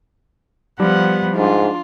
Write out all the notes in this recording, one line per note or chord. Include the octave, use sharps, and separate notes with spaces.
F3 G3 B3 F#5
G#2 D4 F4